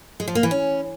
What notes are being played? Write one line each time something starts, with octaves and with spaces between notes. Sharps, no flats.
G#3
F3
A#3
E3
C#4